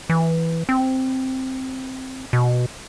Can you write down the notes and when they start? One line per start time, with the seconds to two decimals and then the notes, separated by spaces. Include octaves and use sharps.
0.10 E3
0.69 C4
2.33 B2